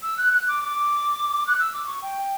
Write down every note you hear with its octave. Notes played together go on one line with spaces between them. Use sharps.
E6
F#6
F#6
D6
D6
F#6
E6
D6
C#6
G5